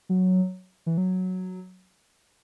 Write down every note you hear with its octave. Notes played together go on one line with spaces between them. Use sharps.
F#3
E3
F#3